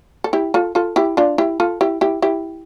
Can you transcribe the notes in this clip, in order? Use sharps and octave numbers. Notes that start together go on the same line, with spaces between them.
A4
E4 G4
F4 A4
F4 A4
E4 G4
D4 F4
E4 G4
F4 A4
E4 G4
E4 G4
E4 G4